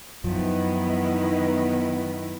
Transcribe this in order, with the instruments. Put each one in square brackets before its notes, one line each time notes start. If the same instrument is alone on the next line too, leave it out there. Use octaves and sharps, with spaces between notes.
[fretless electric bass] F#2 F3 [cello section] D#3 B3 E4